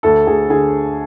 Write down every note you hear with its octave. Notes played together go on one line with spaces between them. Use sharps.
D2 A4
D2 G#4
D3 G#4